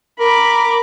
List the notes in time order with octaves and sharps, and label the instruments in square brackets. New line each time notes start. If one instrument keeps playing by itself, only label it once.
[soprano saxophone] A#4 [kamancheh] B5 D6